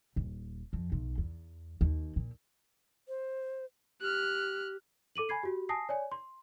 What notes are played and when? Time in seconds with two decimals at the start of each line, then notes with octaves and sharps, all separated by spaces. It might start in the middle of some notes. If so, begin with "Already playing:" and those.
0.16 D#1
0.73 F2
0.92 B1
1.18 E2
1.81 D#2
2.16 A#2
3.08 C5
4.01 G4 F6 F#6
5.15 A4 D6 D#7 F#7
5.29 G#5 B5 G#6 C7
5.43 F#4 G4
5.69 G#5 A5 D#6 A#6 C7
5.89 C#5 D5 G#5
6.12 C6